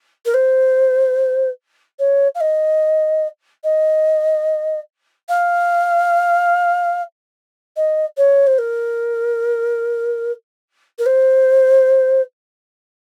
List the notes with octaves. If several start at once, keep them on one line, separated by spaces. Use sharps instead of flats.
A#4
C5
C#5
F5
D#5
D#5
F5
D#5
C#5
C5
A#4
A#4
C5